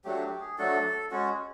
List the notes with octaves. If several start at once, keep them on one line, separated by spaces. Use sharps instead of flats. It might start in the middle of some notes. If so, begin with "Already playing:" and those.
F#3 A3 D4 F#4 G4
G4
G#4
F#3 A3 D4 F#4 A4
G#3 C#4 F#4